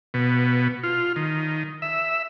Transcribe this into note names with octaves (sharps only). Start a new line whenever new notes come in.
B2
F4
D#3
E5